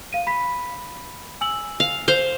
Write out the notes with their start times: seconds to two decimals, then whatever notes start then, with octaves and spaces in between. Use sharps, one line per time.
0.13 F5 D#7
0.27 B5 B6
1.41 G#5 E6 F#7
1.80 F5
2.08 C5 F5